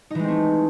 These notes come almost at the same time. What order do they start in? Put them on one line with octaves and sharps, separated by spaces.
D#4 E3 G#3 C4 A3